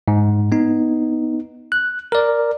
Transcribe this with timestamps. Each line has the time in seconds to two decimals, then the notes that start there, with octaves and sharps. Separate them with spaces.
0.08 G#2
0.52 B3 D#4
1.72 F#6
2.12 A#4 D5